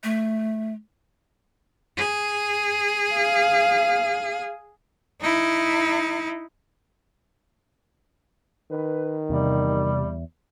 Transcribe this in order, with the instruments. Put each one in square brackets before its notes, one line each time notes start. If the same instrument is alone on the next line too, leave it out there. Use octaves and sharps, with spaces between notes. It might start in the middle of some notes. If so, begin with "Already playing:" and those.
[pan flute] A3
[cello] G#4
[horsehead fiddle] F5
[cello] D#4 E4
[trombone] D#3 [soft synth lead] B4
[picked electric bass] E2 [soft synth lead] C3 [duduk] G3